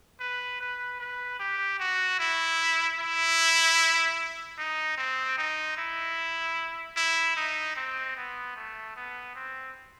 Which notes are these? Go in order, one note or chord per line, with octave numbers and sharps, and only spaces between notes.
B4
B4
B4
G4
F#4
E4
E4
D#4
C4
D#4
E4
E4
D#4
C4
B3
A3
B3
C4